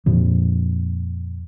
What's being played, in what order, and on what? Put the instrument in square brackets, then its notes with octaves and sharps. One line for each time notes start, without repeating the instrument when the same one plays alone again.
[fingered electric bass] F2 A#2 F3